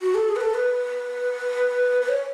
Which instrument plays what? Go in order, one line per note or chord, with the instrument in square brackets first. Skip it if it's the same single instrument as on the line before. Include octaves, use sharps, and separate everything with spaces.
[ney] F#4
A4
G#4
B4
A4
B4
B4
C#5